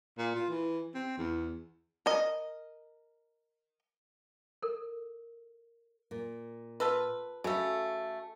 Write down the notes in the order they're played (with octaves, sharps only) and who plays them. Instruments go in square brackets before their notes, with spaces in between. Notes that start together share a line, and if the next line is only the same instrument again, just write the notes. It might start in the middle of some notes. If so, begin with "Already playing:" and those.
[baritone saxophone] A#2
F4
E3
C4
E2
[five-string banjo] A#4 D#5
[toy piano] A4 A#4
[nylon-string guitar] A#2
[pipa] F4 A4 B4
[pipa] C#3 A3 [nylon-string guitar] F#4 A4 C#5